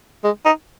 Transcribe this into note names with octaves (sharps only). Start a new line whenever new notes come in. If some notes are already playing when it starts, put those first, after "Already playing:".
G#3
D#4